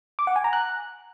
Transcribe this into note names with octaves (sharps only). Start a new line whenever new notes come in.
D6
F#5
G#5
A#5
F#6